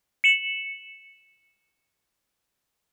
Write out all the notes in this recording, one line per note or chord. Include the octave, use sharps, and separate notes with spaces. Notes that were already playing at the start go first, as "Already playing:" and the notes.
C#7 E7 F#7